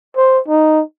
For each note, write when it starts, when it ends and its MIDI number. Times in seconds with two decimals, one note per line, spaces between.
0.17 0.39 72
0.48 0.82 63